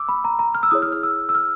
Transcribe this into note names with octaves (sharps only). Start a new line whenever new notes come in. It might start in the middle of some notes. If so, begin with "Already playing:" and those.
Already playing: D6 E6
B5
A#5
A#5
F6
E6
E4 G#4 C#5 D#6
F6
F6
E6
E6
F6